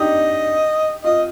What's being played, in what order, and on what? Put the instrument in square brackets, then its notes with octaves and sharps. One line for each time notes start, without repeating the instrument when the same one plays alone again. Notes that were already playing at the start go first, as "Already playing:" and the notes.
Already playing: [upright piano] D4 D#4 G4 [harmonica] D#5
[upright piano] F4 [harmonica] D#5